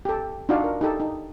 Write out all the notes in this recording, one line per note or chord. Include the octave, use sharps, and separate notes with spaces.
G4 A4
D4 D#4 F4 F#4 D5 F5
A#4
D#4 G4 A4
D#4